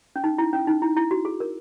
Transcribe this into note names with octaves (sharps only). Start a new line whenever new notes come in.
C#4
D#4
E4
C#4
D#4
E4
E4
F#4
G#4
A#4